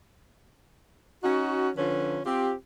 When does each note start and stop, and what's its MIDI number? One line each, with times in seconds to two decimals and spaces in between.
1.24 1.69 61
1.24 1.69 63
1.24 1.69 66
1.76 2.20 50
1.76 2.20 53
1.76 2.20 61
1.76 2.20 65
1.76 2.20 71
2.26 2.52 60
2.26 2.52 65
2.26 2.52 67